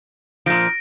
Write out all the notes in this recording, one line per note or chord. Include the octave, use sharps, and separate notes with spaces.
A#2 F3 A#6 D7